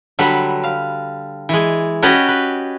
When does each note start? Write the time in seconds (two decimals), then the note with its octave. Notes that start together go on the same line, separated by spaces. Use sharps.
0.19 D3 F#3 G3 B4
0.64 F5
1.49 E3 G#3
2.03 C#4 F#4 G4 B4 D5 D#5
2.29 B4